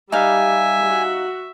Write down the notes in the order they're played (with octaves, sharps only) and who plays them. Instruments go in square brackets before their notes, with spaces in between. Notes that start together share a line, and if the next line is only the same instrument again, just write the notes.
[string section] G3 [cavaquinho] D#4 F5 [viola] E5 [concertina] G#5
[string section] F#4